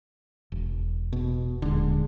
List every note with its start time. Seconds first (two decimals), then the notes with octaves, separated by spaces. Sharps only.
0.52 E1
1.13 B2
1.62 D#1 D3 G#3